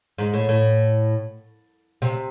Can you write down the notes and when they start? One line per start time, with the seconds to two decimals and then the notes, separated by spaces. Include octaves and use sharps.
0.18 G#2
0.34 A2
0.49 A2
2.02 C3